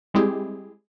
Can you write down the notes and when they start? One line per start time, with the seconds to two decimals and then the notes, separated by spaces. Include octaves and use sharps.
0.14 G3 G#3 C4 E4 G4 G#4